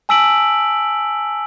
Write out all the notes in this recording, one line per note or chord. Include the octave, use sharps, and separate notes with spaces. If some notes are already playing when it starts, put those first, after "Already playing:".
G#5 A5 E6 B6 D7 F#7